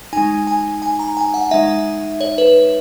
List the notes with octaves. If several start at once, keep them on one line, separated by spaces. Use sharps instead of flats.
G#3 D#4 G#5
G#5
G#5
A#5
G#5
F#5
G#3 D#4 E5
C#5
B4